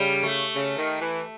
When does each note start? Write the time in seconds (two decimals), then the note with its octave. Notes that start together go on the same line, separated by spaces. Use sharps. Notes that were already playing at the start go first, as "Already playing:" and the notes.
Already playing: C#3 G3
0.23 A3
0.55 C#3
0.78 D#3
1.01 E3